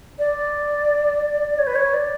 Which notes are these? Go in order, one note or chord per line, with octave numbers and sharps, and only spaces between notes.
D5
C#5
B4
C#5
D5